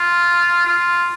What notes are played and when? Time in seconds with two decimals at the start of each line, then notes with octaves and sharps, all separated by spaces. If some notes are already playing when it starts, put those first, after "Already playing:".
Already playing: F4
0.66 F4